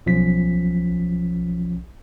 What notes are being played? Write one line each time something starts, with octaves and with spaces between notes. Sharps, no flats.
B1 F3 C#4 F4 B6